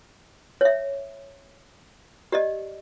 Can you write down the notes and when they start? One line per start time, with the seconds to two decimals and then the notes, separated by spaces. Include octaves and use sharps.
0.61 C#5 E5
2.32 G4 D5 D#5